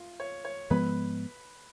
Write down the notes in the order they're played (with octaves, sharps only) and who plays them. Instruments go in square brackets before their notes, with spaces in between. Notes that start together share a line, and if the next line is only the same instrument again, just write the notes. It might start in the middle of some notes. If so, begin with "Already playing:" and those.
Already playing: [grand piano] F4 F5
C#5
C#5
[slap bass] G#2 F3 G#3 B3 [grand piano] B4 B5